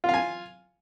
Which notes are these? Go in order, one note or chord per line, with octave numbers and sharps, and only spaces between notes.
F4 F5 G#5